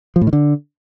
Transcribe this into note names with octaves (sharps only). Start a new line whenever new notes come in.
F3
A2
D#3
D3